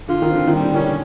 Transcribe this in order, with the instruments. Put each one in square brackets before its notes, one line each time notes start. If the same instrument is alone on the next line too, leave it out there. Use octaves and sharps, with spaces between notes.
[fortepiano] D3 [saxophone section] F4
[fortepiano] D#3
[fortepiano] D3 [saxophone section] C4
[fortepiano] D#3
[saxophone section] G3
[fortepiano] D3
[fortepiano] D#3 [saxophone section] C#4
[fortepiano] D3